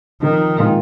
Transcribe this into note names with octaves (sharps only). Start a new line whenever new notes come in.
D#3 F3 C4 D#4 A#4
A#2 G#3 C4 F4 A#4